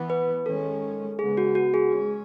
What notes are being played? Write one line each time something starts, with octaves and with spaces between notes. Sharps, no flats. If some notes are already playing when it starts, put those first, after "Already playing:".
Already playing: E3 B3
B4
D#3 G#3 C#4 A4
C#3 G#3 B3 G#4
F#4
F#4
G#4
G#3 C#4